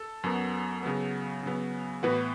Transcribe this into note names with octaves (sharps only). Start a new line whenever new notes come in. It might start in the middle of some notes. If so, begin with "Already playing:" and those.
Already playing: A4
F#2 F#3 B3
C#3 F#3 B3
C#3 F#3 B3
A2 E3 B3 F#4 B4